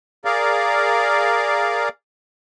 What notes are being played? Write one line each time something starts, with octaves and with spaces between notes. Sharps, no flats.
G#4 A#4 D5 F5